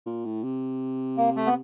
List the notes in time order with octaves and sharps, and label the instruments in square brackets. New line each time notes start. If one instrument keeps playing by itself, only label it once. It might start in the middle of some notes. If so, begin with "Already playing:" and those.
[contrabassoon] A#2
A2
C3
[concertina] A#3
A3
B3